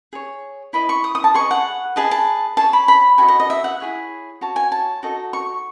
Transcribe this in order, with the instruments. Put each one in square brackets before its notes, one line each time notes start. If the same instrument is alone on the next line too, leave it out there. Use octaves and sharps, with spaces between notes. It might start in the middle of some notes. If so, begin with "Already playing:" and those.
[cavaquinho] G#4 C#5
E4 B4 D#5 B5
C#6
D#6
D#6
A5
G#4 B4 D#5 C#6
F#5
G#4 B4 D#5 A5
A5
G#4 C#5 A5
B5
B5
F#4 A4 D#5 G#5
D#5
D#5
E5
F#5
E4 G#4 C#5
F#4 C#5 A5
G#5
A5
D#4 F#4 A4 D#5
C#6